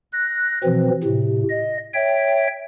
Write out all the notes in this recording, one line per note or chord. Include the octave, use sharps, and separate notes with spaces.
F#6 A#6
B2 E3 F3 C4
A2 C3
D#5
C#5 E5 G5